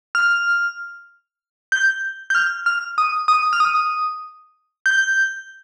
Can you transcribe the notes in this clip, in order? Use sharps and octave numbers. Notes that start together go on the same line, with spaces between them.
F6
G6
G6
F6
F6
D#6
D#6
F6
D#6
G6